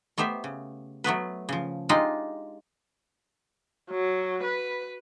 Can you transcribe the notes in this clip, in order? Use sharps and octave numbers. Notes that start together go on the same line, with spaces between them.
A3 B3 G4 C5 E5
C#3
F#3 A3 B3 B4
C#3 F3
G#3 D4 D#4 F4 G4
F#3
B4